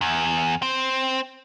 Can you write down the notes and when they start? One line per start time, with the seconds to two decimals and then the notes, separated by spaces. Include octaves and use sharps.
0.01 E2
0.62 C4